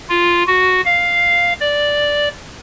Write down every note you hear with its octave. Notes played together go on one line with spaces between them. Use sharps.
F4
F#4
F5
D5